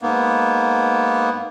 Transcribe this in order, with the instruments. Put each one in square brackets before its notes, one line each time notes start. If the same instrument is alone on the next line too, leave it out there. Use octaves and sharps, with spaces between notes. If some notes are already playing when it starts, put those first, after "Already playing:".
[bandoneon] G#2 A#3 B3